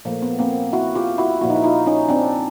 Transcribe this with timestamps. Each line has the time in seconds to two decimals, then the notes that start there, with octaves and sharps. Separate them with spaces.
0.05 A#2 F3 A3 A#3
0.22 B3
0.39 A#3 C4
0.73 E4 F#4
0.95 F4 G4
1.18 E4 F#4
1.41 A#2 F3 A#3 E4 F#4
1.50 D#4
1.56 E4
1.64 D#4 F4
1.86 C#4 D#4
2.09 C4 D4